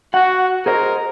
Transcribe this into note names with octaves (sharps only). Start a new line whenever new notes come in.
F#4 F#5
G#4 A#4 C5 D#5